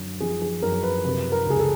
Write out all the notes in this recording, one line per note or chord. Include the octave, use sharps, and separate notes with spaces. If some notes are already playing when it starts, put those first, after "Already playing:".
Already playing: F#2 D3
F3 G#4
G#4
F#2 A#4
B4
C3 B4
A#4
C#2 G#4
A4